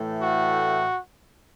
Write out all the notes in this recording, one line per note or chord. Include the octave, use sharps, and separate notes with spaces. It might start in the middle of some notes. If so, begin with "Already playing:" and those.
Already playing: A2 E3 A3
F#4